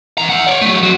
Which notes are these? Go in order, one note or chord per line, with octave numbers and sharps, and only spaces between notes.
E3 A#5
E5 F#5
C#5 D5
F#3 A3
F2 F#3